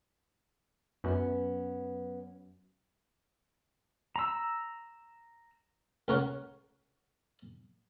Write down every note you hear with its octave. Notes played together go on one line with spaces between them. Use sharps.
F#2 B3 C#4
A#5 E6
C#2 A#4 C#5 F#5